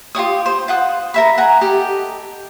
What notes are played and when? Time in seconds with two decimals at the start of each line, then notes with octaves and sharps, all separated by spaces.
0.15 F4 G4 C#5 D#6
0.46 C5
0.68 F4 F#5 D#6
1.14 A#4 E5 B5
1.38 F#5 G#5 A#5
1.61 G4 A4 D#5